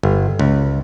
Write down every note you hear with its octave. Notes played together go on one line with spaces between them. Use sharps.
G1
C#2